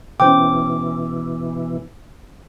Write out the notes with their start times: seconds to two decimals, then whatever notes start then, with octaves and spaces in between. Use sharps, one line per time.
0.20 B2 E3 C#4 C5 G5 D6